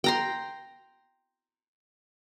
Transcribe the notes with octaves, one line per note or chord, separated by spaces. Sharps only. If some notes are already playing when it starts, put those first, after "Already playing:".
G5 A#5 C6